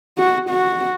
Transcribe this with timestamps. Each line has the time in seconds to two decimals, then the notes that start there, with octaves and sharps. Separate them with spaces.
0.18 F#4
0.50 F#4